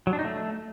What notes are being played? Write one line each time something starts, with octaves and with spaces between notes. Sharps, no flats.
F#3
D4
D#4
A3